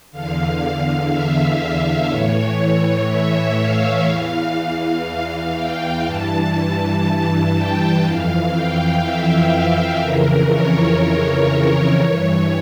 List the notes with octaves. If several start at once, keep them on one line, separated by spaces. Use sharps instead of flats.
E2 D3 F5
E5
A2 E3 C#5
E5
F5
E2 E3
F5
G5
G2 E3 A5
A5
G5
F2 E3 F5
G5
E5
F2 C#3 E3 A#4
C#5
C#5
C#5
G2 E3 C#5